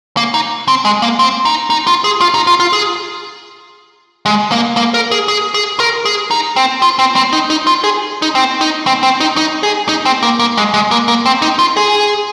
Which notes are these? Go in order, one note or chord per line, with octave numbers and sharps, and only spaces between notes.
A#3
D#4
C4
G#3
A#3
C4
D#4
D#4
F4
G#4
F4
D#4
F4
F4
G#4
G#3
A#3
A#3
A#4
G#4
G#4
G#4
A#4
G#4
D#4
C4
F4
C4
C4
D#4
D#4
F4
G#4
D#4
C4
D#4
C4
C4
D#4
D#4
G#4
D#4
C4
A#3
A#3
G#3
G#3
A#3
A#3
C4
D#4
F4
G#4